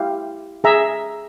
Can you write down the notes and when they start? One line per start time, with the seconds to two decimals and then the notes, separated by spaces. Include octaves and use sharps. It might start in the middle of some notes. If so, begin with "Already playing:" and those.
Already playing: E4 G4 F5
0.64 G#4 E5 A#5